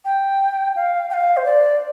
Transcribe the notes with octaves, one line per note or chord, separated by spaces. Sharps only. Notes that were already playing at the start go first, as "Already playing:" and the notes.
G5
F5
G5
F5
C5
D5